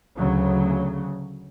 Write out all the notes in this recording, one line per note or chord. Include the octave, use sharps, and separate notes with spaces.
D2 C#3 F#3